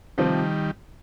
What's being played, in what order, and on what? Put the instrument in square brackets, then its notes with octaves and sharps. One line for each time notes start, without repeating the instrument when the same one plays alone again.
[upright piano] C3 F3 C4 [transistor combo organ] D#3 G3